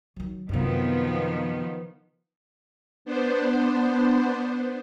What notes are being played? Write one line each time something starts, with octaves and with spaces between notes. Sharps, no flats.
D#3 F#3
F#2 C3 D#3 F3 B3
B3 D4 C5